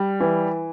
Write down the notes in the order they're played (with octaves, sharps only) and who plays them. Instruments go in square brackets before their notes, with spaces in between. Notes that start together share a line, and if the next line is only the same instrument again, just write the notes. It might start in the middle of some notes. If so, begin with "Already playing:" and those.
Already playing: [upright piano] G3
E3